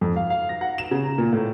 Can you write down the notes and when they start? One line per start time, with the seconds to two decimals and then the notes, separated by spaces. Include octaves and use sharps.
0.01 F2
0.16 F5
0.30 F5
0.49 A#6
0.61 F#5
0.78 E7
0.91 C#3
1.04 A#5
1.18 A#2
1.33 A2